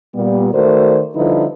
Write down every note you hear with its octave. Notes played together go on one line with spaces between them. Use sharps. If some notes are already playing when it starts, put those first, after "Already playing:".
A#2 G3 B3
D#3 A3 F#4 A#4 C5 D5
D3 F3 G3 D#4 E4 B4